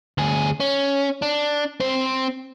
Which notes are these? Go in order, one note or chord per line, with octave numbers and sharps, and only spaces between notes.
D2 G#4
C#4
D4
C4 C5